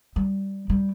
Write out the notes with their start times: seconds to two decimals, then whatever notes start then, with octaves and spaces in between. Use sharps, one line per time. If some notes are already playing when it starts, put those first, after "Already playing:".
0.16 G3
0.70 G3